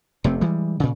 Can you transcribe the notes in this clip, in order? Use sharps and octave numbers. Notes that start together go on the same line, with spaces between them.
F1 C3 A3 C4
E3 G3 G#3
A#2 C#3